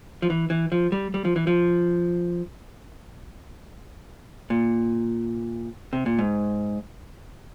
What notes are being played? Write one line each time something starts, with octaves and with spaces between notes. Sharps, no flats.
F3
E3
E3
F3
G3
G3
F3
E3
F3
A#2
C3
A#2
G#2